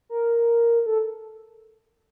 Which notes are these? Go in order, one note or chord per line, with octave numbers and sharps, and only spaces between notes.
A#4
A4